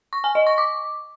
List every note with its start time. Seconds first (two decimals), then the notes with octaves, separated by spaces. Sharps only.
0.13 C#6
0.24 G#5
0.35 D#5
0.47 C#6
0.58 D6